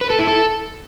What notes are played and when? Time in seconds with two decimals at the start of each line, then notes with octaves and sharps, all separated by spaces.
0.01 B4
0.10 A4
0.19 E4
0.27 A4